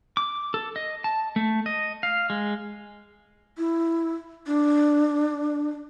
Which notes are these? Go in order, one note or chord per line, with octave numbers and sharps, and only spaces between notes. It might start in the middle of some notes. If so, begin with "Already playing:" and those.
D6
A4
D#5
A5
A3
D#5
F5
G#3
E4
D4